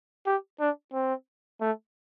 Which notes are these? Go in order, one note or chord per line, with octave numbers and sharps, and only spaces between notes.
G4
D4
C4
A3